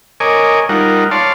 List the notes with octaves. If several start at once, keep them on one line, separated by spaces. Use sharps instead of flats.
A#4 C#5 D#5 G#5 D6
G3 D#4 F4 A#4 F#5
C#5 D5 F5 A5 C6